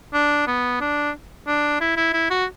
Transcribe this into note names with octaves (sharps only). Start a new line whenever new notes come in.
D4
B3
D4
D4
E4
E4
E4
F#4